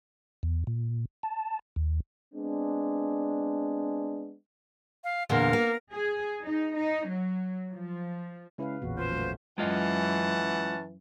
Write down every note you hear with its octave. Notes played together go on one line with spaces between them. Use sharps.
E2
A#2
A5
D#2
G#3 B3 C4 D4
F5
E2 A#2 D3 A#4 F5
A#3
G#4
D#4
D#4
F#3
F3
C#3 G#3 C#4 E4 B4 F5
A1 E2 A#2 C#4 F#4
F3 B4 C5
F#3 A3
F#2 E3 G#3 C#4 F4 D#5 F#5 A5